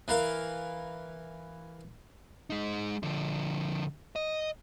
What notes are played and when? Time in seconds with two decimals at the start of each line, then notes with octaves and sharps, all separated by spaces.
0.08 E3 A#4 F5
2.50 G#3 D#4
3.03 D3 F3
4.16 D#5